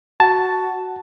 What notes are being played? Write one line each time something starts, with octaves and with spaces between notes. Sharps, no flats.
F#4 A5